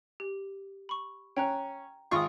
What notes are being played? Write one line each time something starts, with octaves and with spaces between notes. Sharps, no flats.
G4
B5 C#6
C#4 G5 A#5 F#6
G#1 F4 F5 C#6 D#6